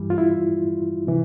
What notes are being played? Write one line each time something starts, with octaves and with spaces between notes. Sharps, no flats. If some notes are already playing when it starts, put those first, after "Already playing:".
Already playing: G2 E3 G3
F4
E4
C3 E3